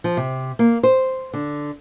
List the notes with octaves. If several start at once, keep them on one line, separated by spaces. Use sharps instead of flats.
F3
C3
A#3
C5
D3